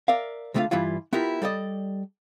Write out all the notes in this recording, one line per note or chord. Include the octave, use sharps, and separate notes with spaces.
A#4 D5 E5 F5
C#2 D3 A3 E4 F4 F5
G2 E3 G3 E4 F4
B3 E4 F4 G4 A#4
G3 A4 D5 D#5